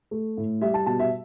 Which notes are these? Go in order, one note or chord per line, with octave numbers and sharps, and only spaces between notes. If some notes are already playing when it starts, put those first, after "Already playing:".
A3
A2
G3 E5
A5
B2 A5
E5